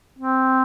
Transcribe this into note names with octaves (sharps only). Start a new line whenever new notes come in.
C4